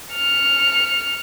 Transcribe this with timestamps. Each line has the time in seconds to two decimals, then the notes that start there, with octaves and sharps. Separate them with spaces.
0.14 F6 C#7